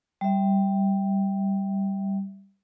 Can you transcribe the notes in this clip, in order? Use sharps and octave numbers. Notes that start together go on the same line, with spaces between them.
G3 E5